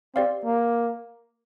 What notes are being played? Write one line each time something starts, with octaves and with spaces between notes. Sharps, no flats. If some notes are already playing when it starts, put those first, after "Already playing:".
C4 G4 D5 F5
A#3